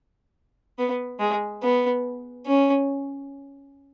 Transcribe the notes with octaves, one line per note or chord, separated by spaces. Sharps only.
B3
G#3
B3
C#4